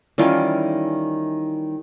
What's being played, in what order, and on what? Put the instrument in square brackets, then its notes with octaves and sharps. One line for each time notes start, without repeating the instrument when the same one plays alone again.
[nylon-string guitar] D#3 G3 C#4 [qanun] E3 F4